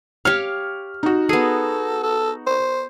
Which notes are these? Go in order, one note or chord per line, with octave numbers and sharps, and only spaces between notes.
G4 C#5 F5 F6
D#4 F#4
B3 G#4 A4
A4
C5